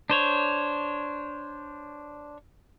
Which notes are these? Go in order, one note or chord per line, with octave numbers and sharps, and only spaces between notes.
D4 C5 C#5